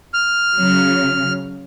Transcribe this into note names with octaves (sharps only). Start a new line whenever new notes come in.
F6
C#3 F#3